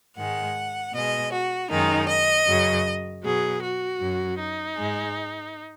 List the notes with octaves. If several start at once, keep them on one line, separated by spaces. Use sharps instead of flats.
G#2 D#3 G#3 F#5
B2 G#3 D#5
F#4
F#2 D#3 G#3 D#4
D#5
F#2 C#3 F#3
B2 F#3 G#4
F#4
F#2 F#3
D#4
G#2 G#3